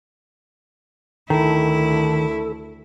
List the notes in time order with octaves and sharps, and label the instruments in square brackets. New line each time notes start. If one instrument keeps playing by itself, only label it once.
[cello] D2 E4 [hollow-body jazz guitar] D#3 [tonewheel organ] A4